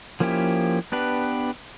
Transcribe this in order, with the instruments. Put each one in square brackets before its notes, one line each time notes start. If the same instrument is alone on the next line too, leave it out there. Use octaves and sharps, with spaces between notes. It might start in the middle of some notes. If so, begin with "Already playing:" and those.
[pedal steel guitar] F3 A#3 C#4 E4 G4
B3 D4 G4 B4